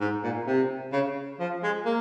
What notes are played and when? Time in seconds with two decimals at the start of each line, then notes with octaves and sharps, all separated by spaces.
0.01 G#2
0.24 A#2
0.47 C3
0.93 C#3
1.40 F3
1.63 G#3
1.85 A#3